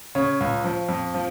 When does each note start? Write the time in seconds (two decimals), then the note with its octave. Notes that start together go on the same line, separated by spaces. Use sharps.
0.15 C#3 C#5
0.40 C#2
0.64 F3
0.89 F2
1.14 F3